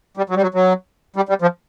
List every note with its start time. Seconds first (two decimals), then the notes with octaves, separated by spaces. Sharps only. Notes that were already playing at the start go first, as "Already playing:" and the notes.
0.17 G3
0.30 F#3
0.36 G3
0.42 F#3
0.55 F#3
1.16 G3
1.29 G3
1.42 F3